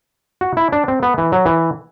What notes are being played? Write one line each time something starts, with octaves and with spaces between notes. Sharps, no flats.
F#4
E4
D4
C4
B3
E3
F#3
E3